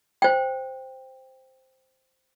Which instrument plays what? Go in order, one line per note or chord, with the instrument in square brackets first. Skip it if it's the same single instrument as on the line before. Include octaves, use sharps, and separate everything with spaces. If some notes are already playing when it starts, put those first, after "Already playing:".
[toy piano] C5 G5